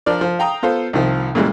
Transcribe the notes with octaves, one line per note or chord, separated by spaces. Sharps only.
F3 D4 A#4 D5
F3
F5 G5 A#5 D#6
B3 F4 A4 C5
C2 D#3 F3
A#2 C#3 E3 G3 G#3